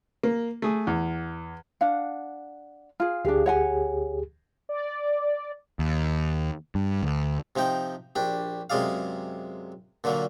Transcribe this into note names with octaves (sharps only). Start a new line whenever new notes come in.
A#3
A3 G#4
E2
D4 F5 F#5
F4 G#4
D2 D4 G4 G#4 F5
C#5 F#5 G#5
D5
D#2
G2
D2
C3 F3 D#4 G5
A#1 D4 G4
F#2 C3 G#3 G#4 D5 F5
A#2 D3 F#3 A#3